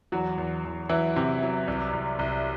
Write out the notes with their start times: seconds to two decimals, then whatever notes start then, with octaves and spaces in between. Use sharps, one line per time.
0.12 E2 F#3 F#4
0.38 E2
0.65 E2
0.89 E3 F#3 E4
1.16 C3
1.42 F#3
1.68 C2
1.93 C2
2.19 C2